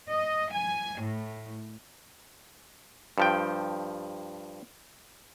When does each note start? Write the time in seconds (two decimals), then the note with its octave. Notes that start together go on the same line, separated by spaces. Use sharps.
0.10 D#5
0.53 G#5
1.03 A2
3.18 G2 F3 G5